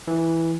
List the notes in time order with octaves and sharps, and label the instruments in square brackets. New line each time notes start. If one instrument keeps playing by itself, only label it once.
[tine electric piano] E3